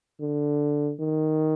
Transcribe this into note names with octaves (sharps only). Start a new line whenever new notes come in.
D3
D#3